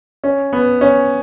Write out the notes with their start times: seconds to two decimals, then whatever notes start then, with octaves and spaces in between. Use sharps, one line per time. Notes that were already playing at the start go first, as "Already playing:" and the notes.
0.24 C#4
0.53 B3
0.81 C#4